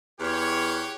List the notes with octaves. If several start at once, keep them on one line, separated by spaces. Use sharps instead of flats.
E2 G4 C#5